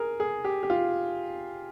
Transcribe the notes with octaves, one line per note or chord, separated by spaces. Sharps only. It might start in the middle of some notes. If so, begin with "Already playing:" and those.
Already playing: G#4 A#4
G#4
G4
G4
F4